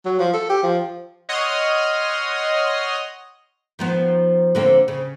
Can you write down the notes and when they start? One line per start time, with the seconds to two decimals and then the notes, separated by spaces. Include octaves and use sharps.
0.05 F#3
0.19 F3
0.33 A4
0.49 G4
0.63 F3
1.29 C#5 D#5 F#5 C6 D#6 F6
3.79 D#3 F3 B3
4.55 D3 A#3 C4
4.88 C#3